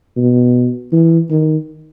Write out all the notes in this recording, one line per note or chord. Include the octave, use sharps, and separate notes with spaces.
B2
E3
D#3